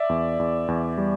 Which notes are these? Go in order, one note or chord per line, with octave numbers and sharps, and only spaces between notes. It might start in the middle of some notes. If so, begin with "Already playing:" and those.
Already playing: D5 E5
E2
E2
E2
G3